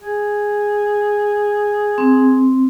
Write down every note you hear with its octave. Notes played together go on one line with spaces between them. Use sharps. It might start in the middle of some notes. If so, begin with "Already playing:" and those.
G#4
C4